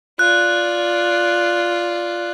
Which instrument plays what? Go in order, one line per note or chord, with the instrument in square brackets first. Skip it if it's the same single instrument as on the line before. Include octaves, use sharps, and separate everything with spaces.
[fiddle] F4 D5 [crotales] F#6